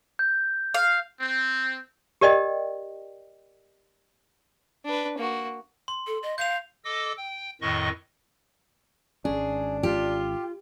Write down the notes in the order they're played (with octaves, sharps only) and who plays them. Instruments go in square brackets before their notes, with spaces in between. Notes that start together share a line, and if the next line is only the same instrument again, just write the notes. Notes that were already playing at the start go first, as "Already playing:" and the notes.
[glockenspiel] G6
[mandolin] F5
[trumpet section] C4
[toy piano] G4 A#4 D5 D#5 G5
[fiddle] D4 B4
A#3 F#4
[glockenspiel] C6
[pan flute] A4
D#5
[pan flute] F5 [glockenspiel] G6 F7
[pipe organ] A4 D#5 D6 E6
G5
F2 A2 D#3 D#5 C#6
[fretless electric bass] G#1 C#4 [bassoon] D4 [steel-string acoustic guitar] G#4
[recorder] F4 [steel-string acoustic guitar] G4